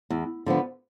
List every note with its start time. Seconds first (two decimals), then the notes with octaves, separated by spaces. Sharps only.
0.10 E2
0.46 D3 F3 B3